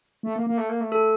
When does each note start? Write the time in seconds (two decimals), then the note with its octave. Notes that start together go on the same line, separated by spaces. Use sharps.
0.23 A3
0.36 A#3
0.47 A#3
0.58 A3
0.69 A#3
0.81 A3
0.92 A4